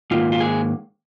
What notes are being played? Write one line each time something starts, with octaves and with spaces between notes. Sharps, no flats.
G#2 D#3 A#3 F4
F4
G#4